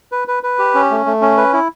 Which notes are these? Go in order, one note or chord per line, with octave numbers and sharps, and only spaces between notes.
B4
B4
B4
G4
C#4
A3
A3
C#4
B4
E4